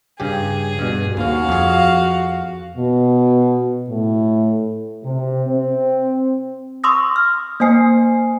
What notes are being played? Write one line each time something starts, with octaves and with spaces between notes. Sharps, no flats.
G2 C#3 G4 G#4
G2 B2
D#2 C#4 F#4 F5
F2 G#4
B2
A2
C3
C4
C6 C#6 D#6 E6 A#6
F6
A#3 C5 G#5 C7